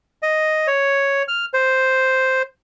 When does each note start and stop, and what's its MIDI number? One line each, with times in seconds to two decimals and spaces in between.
0.23 0.67 75
0.67 1.23 73
1.28 1.46 89
1.54 2.42 72